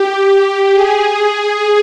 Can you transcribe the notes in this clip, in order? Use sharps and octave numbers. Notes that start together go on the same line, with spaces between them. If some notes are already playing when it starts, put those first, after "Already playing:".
Already playing: G4
G#4